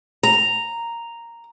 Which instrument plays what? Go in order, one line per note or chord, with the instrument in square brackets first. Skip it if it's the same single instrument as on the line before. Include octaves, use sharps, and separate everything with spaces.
[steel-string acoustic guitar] A#5